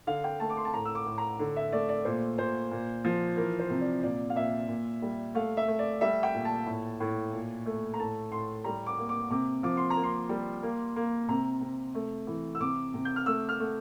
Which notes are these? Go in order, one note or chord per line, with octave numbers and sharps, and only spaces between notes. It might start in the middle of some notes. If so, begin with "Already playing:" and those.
D3 F5
G5
A3 A5
D6
C6
A5
A2 A#5
E6
D6
A2
A#5
D3
E5
A3 D5
D5
A#2 C5
A#2 C5
A#2
F3
E3 A#4
C5
C3
D5
A#2 D5
F5
A#2 E5
A#2
G3
A3 F5
E5
A3
D5
G3 E5
G5
A#2
A5
A2
A2
A#2
A3
A#5
A2 A5
A2 C6
G3 A#5
D6
A#3
D6
C3 D6
F3 D6
C6
A#5
A#3
C6
G3
A#3
A#3
C3 A#5
C3
A3
E3
E6
C3 D6
C3
G6
F6
A3 E6
F6
A3